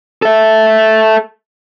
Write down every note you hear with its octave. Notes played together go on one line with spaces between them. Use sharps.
A4 E5